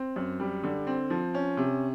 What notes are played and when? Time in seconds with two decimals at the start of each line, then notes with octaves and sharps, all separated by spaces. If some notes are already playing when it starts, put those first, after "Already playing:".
Already playing: C4
0.16 F#2
0.40 G3
0.64 D3
0.87 C4
1.10 F3
1.34 C#4
1.57 C3